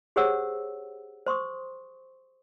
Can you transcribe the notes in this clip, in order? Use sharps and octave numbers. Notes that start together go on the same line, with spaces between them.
G4 G#4 C5 C#5 F#5 E6
C5 C6 C#6 D#6